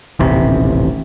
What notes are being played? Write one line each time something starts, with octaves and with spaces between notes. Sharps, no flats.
D#1 A1 C3